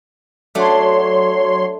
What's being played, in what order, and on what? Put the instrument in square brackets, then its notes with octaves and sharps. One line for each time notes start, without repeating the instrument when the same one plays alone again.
[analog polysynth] F#3 C#5 C6 [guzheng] A3 D4